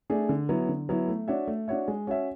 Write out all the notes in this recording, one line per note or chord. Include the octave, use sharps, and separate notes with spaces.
A3 D4 G#4
D3
F#3 B3 E4
D3
F#3 B3 E4
A3
D4 F#4 C#5 E5
A3
D4 F#4 C#5 E5
G#3
C#4 F#4 C#5 E5